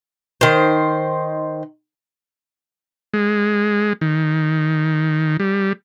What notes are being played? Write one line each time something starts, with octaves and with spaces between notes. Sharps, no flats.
D#3 C5
G#3
D#3
G3